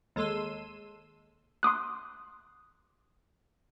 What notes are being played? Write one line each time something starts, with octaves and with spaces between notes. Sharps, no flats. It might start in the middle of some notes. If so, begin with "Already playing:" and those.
D#2 G#3 A4 C6 E6 D#7
C6 D6 D#6 F#6